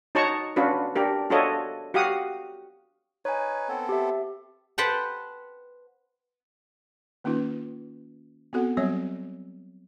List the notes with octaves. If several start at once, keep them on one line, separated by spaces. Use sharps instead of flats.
D#4 F#4 C#5 A5 A#5 C#6
C#4 D4 F4 F#4 B4
D4 G4 A#4
D4 F4 F#4 A4 C#5 D#5
F#4 G4 F5 F#5 D#6
D#4 B4 C#5 G#5
B3 C4 A4
G4 E5
B4 C5 F#5 G5 A5
D#3 A#3 C#4 D#4 F4 B4
B3 C4 F#4 A4 F#5
F#3 G3 C4 C#5 D#5